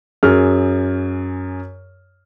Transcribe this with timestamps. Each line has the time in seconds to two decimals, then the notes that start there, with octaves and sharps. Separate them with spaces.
0.23 F#2 G#4 F6